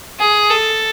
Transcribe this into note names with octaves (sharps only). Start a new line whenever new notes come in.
G#4
A4